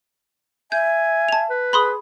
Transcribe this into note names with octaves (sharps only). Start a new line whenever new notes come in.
E5 G#5 G6
A5 F7
B4
G#4 B5 C6 D#6